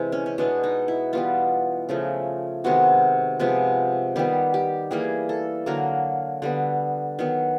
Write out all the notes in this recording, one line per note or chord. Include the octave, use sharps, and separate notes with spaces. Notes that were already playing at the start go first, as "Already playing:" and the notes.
Already playing: C3 E3 G#3
C#4
C#4
B2 G#3 B3 D4
D#4
E4
E3 G3 B3 F4
C#3 F3 A3
C3 D#3 G#3 B3 F#4
C3 F3 G#3 B3
D#3 G3 B3 G4
G4
E3 G3 A#3 G#4
A4
D3 F#3 A#3 A#4
D3 G3 B3
D#3 F#3 B3